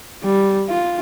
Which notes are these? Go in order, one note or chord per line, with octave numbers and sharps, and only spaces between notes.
G3
F4